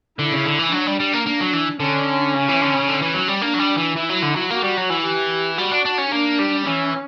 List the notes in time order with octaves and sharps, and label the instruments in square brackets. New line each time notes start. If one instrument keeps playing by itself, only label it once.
[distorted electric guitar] D3 [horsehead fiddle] E4
[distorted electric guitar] C#3
D3
E3
[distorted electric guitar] F#3 [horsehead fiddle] D4
[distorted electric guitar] G3
G3
A#3
[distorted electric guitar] A#3 [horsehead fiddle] D4
[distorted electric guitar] F#3
E3
[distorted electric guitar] D3 [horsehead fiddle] C#4
[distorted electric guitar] C#3
E3
D3
C#3
D3
E3
F#3
G3
[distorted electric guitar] A#3 [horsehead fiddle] D4
[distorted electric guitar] F#3
G3
E3
[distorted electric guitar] E3 [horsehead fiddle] E4
[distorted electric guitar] F#3
D3
F#3
[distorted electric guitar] A#3 [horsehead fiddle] F#4
[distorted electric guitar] G3
F#3
E3
[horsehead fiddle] G4
[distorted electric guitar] G3 [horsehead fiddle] F#4
[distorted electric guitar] D4
D4
C#4
[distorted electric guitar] A#3 [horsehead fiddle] D4
[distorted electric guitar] G3
[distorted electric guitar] E3 [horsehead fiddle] C#4